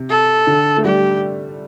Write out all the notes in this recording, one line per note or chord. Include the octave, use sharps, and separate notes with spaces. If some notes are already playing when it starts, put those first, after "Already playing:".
Already playing: C3
A4
D3
A3
G3 G4